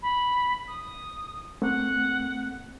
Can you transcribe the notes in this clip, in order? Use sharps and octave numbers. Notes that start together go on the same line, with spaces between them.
B5
D#6
A3 A#3 C4 F#5